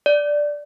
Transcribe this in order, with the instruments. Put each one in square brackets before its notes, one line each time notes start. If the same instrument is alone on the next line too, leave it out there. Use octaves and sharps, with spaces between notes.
[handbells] D5